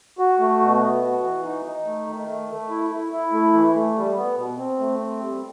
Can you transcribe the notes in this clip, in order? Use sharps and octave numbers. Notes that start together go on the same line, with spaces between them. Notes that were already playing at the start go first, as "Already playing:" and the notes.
F#4
A3
B2
B3
F#4
E3
D#4
D#4
A3
D#3
A3
A3
E4
E4
E4
A3
E3
A3
G3
B3
B2
C4
A3
C4
G3